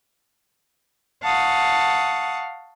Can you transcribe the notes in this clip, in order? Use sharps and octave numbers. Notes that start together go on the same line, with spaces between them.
F5 F#5 A5 C#6 D#6